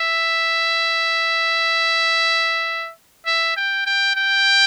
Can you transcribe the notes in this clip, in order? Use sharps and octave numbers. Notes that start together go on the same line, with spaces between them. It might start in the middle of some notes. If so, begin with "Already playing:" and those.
Already playing: E5
E5
G5
G5
G5